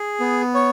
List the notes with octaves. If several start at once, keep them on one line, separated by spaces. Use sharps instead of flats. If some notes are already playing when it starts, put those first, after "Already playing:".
Already playing: G#4
B3
C#5